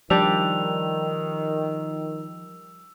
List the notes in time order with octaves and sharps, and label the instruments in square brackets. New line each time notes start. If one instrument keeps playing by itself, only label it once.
[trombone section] D#3 [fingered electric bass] F3 [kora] G3 D4 G4 [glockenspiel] E6 F7